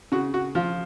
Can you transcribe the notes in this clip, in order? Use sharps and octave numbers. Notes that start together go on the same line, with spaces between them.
C#3 F#4
F#4
F3 F4